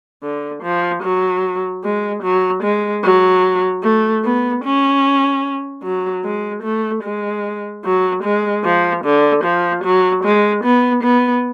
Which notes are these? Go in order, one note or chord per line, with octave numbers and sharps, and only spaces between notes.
D3
F3
F#3
G#3
F#3
G#3
F#3
A3
B3
C#4
F#3
G#3
A3
G#3
F#3
G#3
F3
D3
F3
F#3
G#3
B3
B3